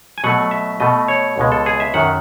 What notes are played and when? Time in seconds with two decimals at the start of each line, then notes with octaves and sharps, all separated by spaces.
0.18 G#5
0.24 B2 F#3 A3 F#5
0.51 E5
0.80 B2 A3 D#5
1.08 C#5
1.38 C#2 B2 G#3
1.52 A4
1.66 G#4
1.80 E5
1.94 F#2 D#3 F#3 F#5